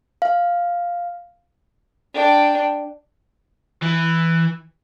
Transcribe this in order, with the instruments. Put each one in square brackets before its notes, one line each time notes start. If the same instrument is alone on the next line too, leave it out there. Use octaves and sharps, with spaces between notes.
[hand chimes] F5
[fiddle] D4 G5
[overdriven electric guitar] E3